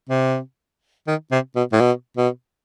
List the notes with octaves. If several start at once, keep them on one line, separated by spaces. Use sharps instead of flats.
C3
D#3
C3
B2
A2
B2
B2